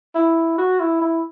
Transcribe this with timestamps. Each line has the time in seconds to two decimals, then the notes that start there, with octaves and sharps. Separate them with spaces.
0.15 E4
0.58 F#4
0.80 E4
1.01 E4